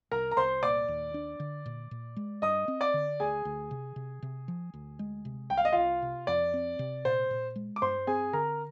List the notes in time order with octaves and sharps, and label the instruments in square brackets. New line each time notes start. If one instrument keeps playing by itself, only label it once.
[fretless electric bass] C2 [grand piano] A#4 A#5
[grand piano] A#5
[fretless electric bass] C2 [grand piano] C5 C6
[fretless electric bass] A#2 [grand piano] D5 D6
[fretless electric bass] D#2
D4
D3
A#2
A#2
G#3
[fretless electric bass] G2 [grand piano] D#5 D#6
[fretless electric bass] C4
[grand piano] D5 D6
[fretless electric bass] D3
[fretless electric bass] D2 [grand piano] G#4 G#5
[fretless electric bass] D2
C3
C3
C3
F3
D2
G#3
C3
[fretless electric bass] C2 [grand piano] G5
[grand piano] F5
D#5
[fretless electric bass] C2 [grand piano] F4 F5
[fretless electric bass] C3
[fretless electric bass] F2 [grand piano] D5
[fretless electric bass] C4
C3
[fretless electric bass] A#2 [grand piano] C5
[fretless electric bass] A#2
G#3
[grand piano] D6
[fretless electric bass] G2 [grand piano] C5 C6
[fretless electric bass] C4 [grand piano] G#4 G#5
[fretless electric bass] D3 [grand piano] A#4 A#5